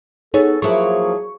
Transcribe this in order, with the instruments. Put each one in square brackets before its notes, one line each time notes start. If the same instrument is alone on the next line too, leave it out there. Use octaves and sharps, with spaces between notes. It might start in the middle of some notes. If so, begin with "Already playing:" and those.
[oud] B3 [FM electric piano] D#4 G#4 C#5 [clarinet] A4
[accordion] F3 A#3 [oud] F#3 E4 [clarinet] G#4 [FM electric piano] C#6